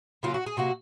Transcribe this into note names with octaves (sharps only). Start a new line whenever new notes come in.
C#3 F#3 A#3 F4
F#4
G#4
C3 F#3 A#3 F#4